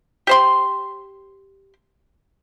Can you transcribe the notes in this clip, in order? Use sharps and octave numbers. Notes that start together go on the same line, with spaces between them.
G4 C5 C6